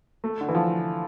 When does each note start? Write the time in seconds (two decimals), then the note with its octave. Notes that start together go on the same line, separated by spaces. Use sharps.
0.24 A3
0.41 D3
0.49 E3
0.55 F3